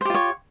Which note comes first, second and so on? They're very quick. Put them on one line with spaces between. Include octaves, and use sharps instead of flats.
C5 G4 F4 C#5